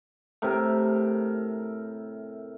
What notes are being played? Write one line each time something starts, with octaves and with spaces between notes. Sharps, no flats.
A2 C3 A#4 E5